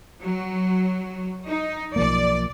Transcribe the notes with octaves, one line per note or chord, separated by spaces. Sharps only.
F#3
D#4
B1 F3 A#3 D5